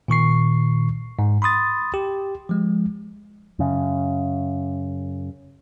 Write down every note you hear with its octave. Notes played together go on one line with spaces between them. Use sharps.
A#2 D#3 C#6 C7
G#2
B5 C6 D#6 A6
G4
F3 G#3
F#2 C#3